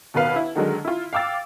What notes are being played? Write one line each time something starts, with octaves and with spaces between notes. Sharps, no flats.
D#2 B2 A#4 B4 F5
E4
D3 D#3 F#3 G#3
E4 F4
F5 G5 D6 E6 A6